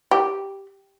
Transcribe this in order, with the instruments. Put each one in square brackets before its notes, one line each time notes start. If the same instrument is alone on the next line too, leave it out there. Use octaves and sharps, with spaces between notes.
[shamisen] G4